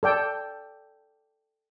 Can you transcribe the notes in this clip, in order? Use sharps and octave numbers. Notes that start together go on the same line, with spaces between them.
A4 D5 G5